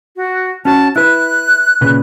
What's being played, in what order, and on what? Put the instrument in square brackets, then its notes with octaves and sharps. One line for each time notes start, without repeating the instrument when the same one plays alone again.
[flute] F#4
[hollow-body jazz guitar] C#4 F#4 C#5 [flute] A5
[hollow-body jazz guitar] E4 B4 [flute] F#6
[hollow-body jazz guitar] A#2 C#3 B4